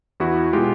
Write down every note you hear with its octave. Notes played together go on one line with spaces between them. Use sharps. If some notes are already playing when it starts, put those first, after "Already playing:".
E2 E4 F#4
B2 G#3 F4 G4